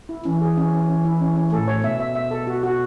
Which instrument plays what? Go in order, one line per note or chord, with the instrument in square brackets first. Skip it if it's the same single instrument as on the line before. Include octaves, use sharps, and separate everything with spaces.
[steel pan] E4
[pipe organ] E3 [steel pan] C#4
[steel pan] G#4
C#4
C#4
C#4
E4
C#4
C#4
[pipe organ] A2 [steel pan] A4
[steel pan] C#5
[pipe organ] B2 [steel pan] E5
[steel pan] E5
E5
A4
F#4
F#4